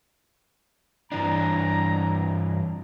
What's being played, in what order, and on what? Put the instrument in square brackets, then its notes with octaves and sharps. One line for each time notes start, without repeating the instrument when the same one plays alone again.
[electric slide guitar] G2 E3 D4 [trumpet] A#5